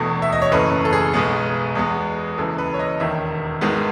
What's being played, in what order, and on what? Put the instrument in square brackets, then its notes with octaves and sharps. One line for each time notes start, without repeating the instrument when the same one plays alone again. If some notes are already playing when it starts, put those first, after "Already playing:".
Already playing: [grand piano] E1 E2 B2 A3
E5
D#5
C#5
F#1 F#2 E3 A3 B4
A4
G#4
B1 B2 G#3 B3
E2 B2 G#3 B3
F#1 F#2 E3 A4
B4
C#5
D#5
E1 D#2 D#3 E5
G#1 G#2 D#3 G#3 B3